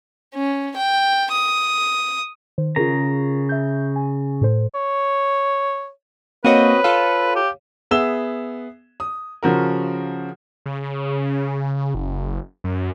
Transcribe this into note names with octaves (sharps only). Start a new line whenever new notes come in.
C#4
G5
D#6
D#3 C5
C#3 F4 G#4 A#4 A#5
E5 G6
G#5
A2 A4 C5
C#5
A#3 C4 F#4 B4 C#5 D#5 D#7
F4 A4 F5
G4
B3 G#4 E5 E6 E7 G7
D#6
C#3 F3 F#4 A#4
C#3
F#1
F#2